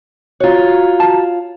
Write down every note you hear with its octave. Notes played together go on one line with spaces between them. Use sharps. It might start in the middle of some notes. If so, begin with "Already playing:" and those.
F4 F#4 C#5 A#5
A5